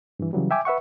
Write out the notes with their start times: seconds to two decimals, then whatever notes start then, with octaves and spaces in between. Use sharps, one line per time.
0.19 G2 E3
0.33 C#3 E3 F#3 G3
0.51 E5 G5 G#5 D6
0.65 B4 E5 F#5 C#6